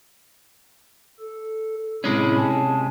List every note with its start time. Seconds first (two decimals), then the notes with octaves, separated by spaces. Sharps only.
1.19 A4
2.04 A2 C3 G#3 C#4 E4 B5
2.36 G#5 A5